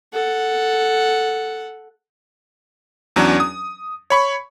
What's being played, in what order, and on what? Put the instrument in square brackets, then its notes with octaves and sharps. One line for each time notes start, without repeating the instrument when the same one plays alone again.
[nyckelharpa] A4 F#5
[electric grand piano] E2 F#3 C#4 D4
D#6
C#5 B5 C#6